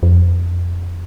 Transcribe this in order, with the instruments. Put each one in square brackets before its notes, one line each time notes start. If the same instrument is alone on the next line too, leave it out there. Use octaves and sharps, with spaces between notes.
[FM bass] F2